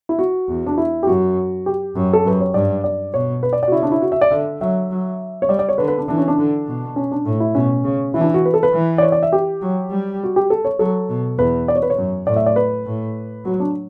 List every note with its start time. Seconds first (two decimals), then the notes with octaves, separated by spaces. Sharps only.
0.09 E4
0.19 F#4
0.49 E2
0.66 D4
0.78 E4
1.03 G4
1.07 F#2 F#4
1.66 G4
1.96 F#2
2.13 A4
2.25 F#2 B4
2.41 C#5
2.54 G2 D5
2.84 D5
3.13 B2 C#5
3.43 B4
3.53 D5
3.63 F#4 D5
3.72 C#3 E4
3.82 D4
3.92 E4
4.02 F#4
4.12 E5
4.21 D5
4.31 D3 E5
4.61 F#3 E5
4.90 F#3
5.42 C#5
5.49 G3 D5
5.59 D5
5.69 C#5
5.78 D3 B4
5.88 B4
5.98 D4
6.08 E3 D4
6.18 C#4
6.28 D4
6.38 D3
6.67 B2
6.96 C#4
7.11 D4
7.25 A2
7.40 E4
7.55 B2 C#4
7.84 C#3
8.14 E3 E4
8.20 D4
8.24 E4
8.34 F#4
8.45 B4
8.54 A4
8.63 B4
8.73 E3
8.98 D5
9.03 C#5
9.12 D5
9.23 E5
9.33 G4
9.62 F#3
9.91 G3
10.23 F#4
10.36 G4
10.50 A4
10.65 C#5
10.79 F#3 A4
11.09 B2
11.39 E2 B4
11.68 D5
11.75 C#5
11.82 B4
11.90 C#5
11.97 F#2
12.27 A2 D5
12.36 E5
12.46 D5
12.56 B4
12.87 A2
13.45 F#3 F#4
13.60 D4